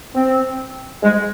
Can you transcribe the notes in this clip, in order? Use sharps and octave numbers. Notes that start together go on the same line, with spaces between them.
C4
G#3